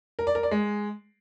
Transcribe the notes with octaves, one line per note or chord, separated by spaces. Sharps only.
A#4
D5
A#4
D5
G#3